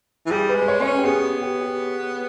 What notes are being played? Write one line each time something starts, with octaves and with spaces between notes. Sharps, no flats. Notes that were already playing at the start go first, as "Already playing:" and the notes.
E3
G3 G#4
B4
G#3
B4
C#5
C#4 C#5
B4
G4
B3 G#4
G4
G4